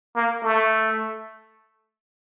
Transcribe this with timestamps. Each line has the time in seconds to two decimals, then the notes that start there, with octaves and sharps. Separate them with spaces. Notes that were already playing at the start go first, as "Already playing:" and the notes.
0.15 A#3
0.43 A3